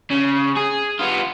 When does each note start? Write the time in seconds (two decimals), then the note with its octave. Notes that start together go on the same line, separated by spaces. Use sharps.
0.10 C#3
0.56 G#4
0.99 B3 F4